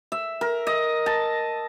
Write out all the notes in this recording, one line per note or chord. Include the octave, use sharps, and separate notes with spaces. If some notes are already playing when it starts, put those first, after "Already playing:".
E5
A#4
D#5
A5